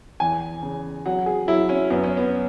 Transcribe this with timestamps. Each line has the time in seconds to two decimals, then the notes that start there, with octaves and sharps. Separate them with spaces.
0.20 E2 G#5
0.63 C#3
1.06 F#3 F#5
1.26 G#4
1.48 F#3 E4
1.69 C#4
1.90 F#2 B3
2.04 C#4
2.17 B3